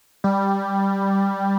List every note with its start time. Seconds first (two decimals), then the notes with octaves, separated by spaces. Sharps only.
0.24 G3